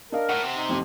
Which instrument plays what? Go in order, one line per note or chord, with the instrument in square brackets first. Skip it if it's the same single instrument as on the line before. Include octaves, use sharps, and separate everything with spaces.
[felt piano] D4 D#5 F5 [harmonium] A#4
[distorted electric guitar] A2 [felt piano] F#5
[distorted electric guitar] C3
[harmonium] D#4
[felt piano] A1 F2